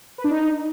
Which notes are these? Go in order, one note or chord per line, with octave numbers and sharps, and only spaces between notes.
B4
D4
D#4